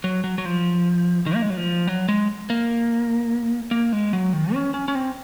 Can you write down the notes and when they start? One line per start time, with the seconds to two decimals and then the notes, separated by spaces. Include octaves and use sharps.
0.04 F#3
0.24 F#3
0.38 F#3
0.45 F3
1.26 D#3
1.35 A#3
1.42 G#3
1.50 F#3
1.57 F3
1.88 F#3
2.09 G#3
2.50 A#3
3.71 A#3
3.92 G#3
4.13 F#3
4.33 D#3
4.53 C#4
4.74 C#4
4.88 C#4
4.95 C4